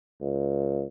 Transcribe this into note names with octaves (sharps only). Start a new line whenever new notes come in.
C#2